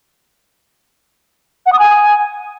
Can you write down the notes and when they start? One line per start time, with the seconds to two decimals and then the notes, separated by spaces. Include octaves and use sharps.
1.66 F#5
1.73 D#6
1.79 G#5